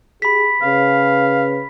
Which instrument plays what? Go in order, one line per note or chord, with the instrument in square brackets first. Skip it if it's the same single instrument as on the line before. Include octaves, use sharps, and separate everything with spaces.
[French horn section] G4 G#4 [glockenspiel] B5 B6
[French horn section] C#3 B4 [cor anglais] F5